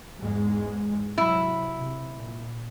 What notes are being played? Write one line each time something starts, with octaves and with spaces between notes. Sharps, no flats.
E2 G#2 G#3
C3 F#3 E4
C3
A#2